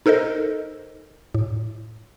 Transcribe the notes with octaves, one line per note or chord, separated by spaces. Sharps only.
D#4 A4 A#4 C5 D#5
A2